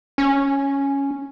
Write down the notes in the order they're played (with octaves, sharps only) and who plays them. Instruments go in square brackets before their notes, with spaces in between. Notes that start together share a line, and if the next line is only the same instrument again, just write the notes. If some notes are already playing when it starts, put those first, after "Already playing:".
[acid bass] C#4